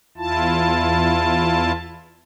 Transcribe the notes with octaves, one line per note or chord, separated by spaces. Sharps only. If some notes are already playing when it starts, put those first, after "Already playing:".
E2 E4 F4 A5